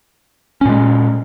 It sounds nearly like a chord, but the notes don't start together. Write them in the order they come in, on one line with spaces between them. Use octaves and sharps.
C#4 A#2 G#3